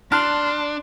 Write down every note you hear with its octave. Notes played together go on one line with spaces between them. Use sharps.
D4 A5 C6 F6 F#6